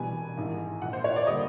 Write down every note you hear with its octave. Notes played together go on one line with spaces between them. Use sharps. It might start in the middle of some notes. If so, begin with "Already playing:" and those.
Already playing: E1 E2 B2 G3 B3 G#5
A1 G#2 D#3
A#1 A#2 F3 F#5
C5
C#5
D5
D3 G3 A#3 D#5